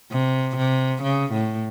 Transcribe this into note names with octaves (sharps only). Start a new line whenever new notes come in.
C3
C3
C#3
A2